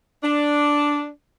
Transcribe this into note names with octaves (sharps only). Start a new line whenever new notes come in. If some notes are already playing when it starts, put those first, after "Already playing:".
D4